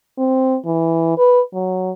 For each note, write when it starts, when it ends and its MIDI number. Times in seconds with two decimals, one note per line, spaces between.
0.18 0.57 60
0.66 1.15 52
1.18 1.41 71
1.54 1.91 54